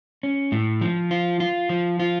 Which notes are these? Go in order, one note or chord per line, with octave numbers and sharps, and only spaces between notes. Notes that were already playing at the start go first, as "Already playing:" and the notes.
C#4
A2
F3
F4
F4
F3
F4